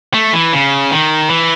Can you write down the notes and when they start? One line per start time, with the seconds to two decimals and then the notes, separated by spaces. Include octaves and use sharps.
0.14 A3
0.33 E3
0.53 C#3
0.91 D#3
1.30 E3